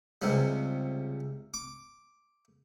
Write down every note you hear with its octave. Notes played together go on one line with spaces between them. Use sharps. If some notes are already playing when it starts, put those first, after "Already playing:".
C#2 C3 G3
D6